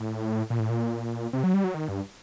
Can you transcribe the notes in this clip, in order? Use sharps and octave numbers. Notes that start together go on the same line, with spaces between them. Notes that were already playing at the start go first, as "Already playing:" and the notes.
Already playing: A2
A#2
A2
A#2
C3
F#3
G3
F#3
D#3
G2